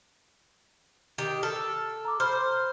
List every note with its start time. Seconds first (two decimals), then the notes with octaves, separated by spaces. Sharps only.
1.18 D#3 G4
1.43 A4 F6
2.05 A#5 D6
2.20 C5 B5 F6